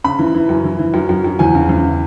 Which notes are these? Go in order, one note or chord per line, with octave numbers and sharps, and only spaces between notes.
C#3 B5
E3
E3
F#2
E3
E3
F#2
F#2
F#2
E2 G#5
C#3
E2